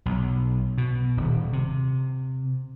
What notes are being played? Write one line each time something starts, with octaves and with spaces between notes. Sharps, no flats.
B1
B2
D#1
C3